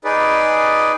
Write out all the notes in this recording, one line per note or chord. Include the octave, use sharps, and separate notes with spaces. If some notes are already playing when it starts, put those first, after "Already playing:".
D#4 G#4 B4 D5